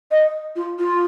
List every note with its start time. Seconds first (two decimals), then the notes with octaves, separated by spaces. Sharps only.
0.11 D#5
0.56 F4
0.79 F4